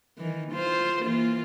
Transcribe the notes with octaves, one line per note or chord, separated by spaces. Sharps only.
D#3 E3
F4 C5
E3 A#3 F4